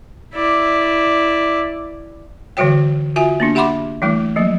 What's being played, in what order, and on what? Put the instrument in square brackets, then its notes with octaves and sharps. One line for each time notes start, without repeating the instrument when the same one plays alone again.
[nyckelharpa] E4 D5
[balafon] D3 E3 G3 F#4 C#5 G5
F4 F#4 E5 G#5
A#3 B3 D4
G4 E5 F#5 B5 C6 D6
E3 G3 A3 E4
F3 F#3 A#3